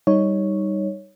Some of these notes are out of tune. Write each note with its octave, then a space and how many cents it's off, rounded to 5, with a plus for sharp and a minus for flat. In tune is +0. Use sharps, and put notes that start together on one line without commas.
G3 +0 D#4 +5 C#5 +0